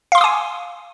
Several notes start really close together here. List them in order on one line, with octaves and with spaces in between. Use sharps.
F5 C6 D6 D#6 G#5